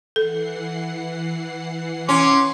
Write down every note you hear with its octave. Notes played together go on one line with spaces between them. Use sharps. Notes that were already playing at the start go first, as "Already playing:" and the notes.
E3 A4 F#5 C7
C#4 C6 D6